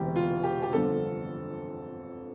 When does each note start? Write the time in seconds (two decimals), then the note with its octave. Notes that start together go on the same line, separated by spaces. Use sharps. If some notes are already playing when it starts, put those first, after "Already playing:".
Already playing: E1 D2 C3 E3 G4
0.16 F4
0.44 G4
0.63 G4
0.73 G1 F2 D3 A4